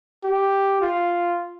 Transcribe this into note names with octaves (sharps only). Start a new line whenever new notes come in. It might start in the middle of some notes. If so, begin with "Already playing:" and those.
G4
F4